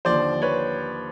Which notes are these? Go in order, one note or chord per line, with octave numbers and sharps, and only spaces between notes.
D#2 D3 F3 C5 D5
B4 C#5